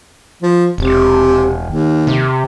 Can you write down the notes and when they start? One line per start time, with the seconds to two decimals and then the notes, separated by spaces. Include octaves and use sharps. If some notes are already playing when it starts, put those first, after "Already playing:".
0.42 F3
0.78 E1 C3
1.66 D#2
2.07 C3